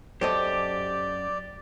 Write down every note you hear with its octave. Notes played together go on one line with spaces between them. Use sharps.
F#2 G4 A4 C5 D5 D#5